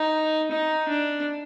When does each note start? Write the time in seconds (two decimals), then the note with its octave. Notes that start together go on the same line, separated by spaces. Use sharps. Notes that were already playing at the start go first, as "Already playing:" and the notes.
Already playing: D#4
0.51 D#4
0.88 D4